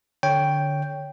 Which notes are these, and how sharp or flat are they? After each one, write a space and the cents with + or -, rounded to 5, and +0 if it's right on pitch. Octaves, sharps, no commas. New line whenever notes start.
D3 +0 C#5 +10 G5 +0